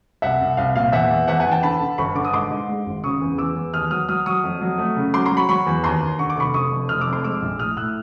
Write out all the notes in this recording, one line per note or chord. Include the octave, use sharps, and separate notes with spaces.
C2 E5 F#5
C2
C2 F5
A#2 F5
E2 E5 F#5
E2
E2 E5 F#5
F#5 G#5
E2
G5 A5
D3 A5 B5
D3
G1 B5 C#6
D3 D6
D#6
G#2 C6 D6
G#2
G#3
G#1
C#3 C#6 D#6
E2
E2 D6 E6
E2
D#2 D#6 F6
F#3 D#6 F6
F#3 D#6 F6
F#3 C#6 D#6
F2
F#3
A3
C#3
F#3 C6 D6
A#5 C6
F#3
B5 C#6
F#3 B5 C#6
E2
D#2 A#5 C6
D#2
D3 C#6
D6
F1 B5 C#6
F1 C#6 D#6
F2
F1 D#6 F6
D6 E6
F2
C6 D6
G#3 D6 E6
A#1
A2 D#6 F6
A2 E6 F#6